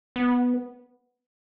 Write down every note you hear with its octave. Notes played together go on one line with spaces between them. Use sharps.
B3